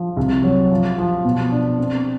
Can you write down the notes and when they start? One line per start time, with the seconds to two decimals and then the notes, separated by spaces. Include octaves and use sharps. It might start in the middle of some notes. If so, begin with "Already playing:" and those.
Already playing: F3
0.17 C2
0.44 F#3
0.71 F3
0.98 F3
1.25 B2
1.51 D4
1.79 C4